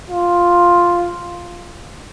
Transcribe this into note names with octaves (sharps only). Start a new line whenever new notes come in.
F4